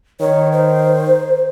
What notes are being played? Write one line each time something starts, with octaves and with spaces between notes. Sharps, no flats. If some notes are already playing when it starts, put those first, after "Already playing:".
D#3 C#5
C5